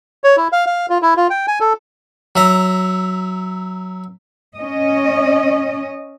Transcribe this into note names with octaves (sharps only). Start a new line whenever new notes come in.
C#5
E4
F5
F5
F4
E4
F4
G5
G#5
A4
F#3 E5 A#5
C#4 D#5